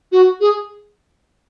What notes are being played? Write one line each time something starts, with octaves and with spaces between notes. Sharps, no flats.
F#4
G#4